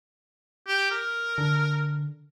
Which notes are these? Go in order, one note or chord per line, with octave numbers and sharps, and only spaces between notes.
G4
A#4
D3